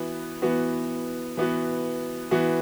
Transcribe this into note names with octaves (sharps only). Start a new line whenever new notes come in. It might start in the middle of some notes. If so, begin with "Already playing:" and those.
Already playing: E3 B3 F#4
E3 B3 F#4
E3 B3 F#4
E3 B3 F#4